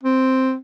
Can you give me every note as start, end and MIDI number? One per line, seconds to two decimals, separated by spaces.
0.03 0.55 60